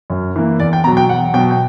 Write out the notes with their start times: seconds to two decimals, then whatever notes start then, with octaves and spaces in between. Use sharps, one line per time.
0.10 F#2
0.36 E3 A#3
0.60 E2 D5
0.73 G5
0.84 B2 F#3 A#5
0.97 G5
1.09 E2 F#5
1.34 B2 F#3 G5
1.51 G5